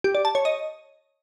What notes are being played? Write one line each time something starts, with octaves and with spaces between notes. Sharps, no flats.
G4
D5
A5
C#5
D#5